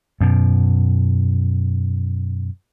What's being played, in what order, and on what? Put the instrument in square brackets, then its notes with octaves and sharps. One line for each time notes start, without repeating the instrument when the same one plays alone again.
[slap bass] F#2 B2